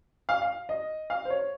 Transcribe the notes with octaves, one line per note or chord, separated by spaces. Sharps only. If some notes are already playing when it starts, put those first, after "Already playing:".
F5
F5
D#5
F5
C5
C#5